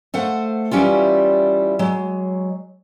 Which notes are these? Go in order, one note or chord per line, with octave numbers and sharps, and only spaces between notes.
A3 C5 F5 F#5
E3 G3 C#4 E4 F4
F#3 G#3